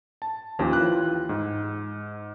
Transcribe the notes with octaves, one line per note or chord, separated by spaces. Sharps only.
A5
D#2 F3 C#4 G4
E3 F4 G5 F#6
G#2